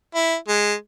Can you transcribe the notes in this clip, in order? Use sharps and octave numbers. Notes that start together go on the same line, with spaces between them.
E4
G#3